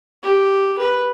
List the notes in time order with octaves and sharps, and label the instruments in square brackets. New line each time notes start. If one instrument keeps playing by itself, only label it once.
[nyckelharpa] G4
B4